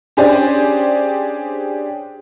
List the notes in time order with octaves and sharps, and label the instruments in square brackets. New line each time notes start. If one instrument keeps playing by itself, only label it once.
[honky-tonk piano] C#4 D4 G4 G#4 C5 D5